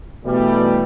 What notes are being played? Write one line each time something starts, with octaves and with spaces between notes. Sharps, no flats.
B2 E3 G3 A3